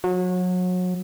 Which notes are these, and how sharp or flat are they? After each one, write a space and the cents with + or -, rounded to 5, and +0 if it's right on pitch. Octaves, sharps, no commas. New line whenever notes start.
F#3 -30